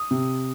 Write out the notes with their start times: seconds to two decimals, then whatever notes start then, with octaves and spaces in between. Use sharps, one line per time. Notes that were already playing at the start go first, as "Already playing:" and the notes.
Already playing: D#6
0.11 C3